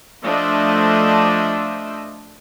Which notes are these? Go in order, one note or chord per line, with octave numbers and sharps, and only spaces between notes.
F3 A3 D4 C5 D#5 E5